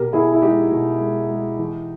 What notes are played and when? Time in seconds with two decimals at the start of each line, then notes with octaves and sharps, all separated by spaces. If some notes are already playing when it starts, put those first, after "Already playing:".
Already playing: B2 G4 A#4
0.13 B2 E4 G#4
0.33 E4
0.42 G#3 D#4 G4
0.72 B2
1.01 G#3
1.30 G#3
1.59 E3